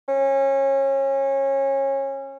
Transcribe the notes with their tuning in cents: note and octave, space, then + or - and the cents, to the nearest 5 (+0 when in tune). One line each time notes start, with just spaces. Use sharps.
C#4 -25